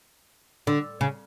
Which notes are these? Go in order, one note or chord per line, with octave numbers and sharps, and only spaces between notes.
D3
C#3